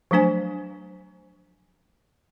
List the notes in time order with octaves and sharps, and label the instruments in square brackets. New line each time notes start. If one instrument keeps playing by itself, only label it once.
[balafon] F3 F#3 A3 D4 C5 G#5